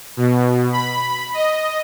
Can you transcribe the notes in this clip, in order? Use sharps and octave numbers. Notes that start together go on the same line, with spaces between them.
B2
B5
D#5